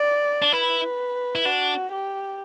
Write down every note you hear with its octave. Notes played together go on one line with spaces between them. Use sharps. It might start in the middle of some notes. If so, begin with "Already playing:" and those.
Already playing: D5
D4
E4 B4
E4
D4 F#4
G4